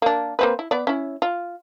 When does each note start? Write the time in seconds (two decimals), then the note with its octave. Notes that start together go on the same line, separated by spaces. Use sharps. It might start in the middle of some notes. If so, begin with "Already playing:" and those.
0.02 A#3 D4
0.39 A#3 C4 B4
0.59 E4
0.71 B3 D5
0.87 C#4 E4
1.22 F4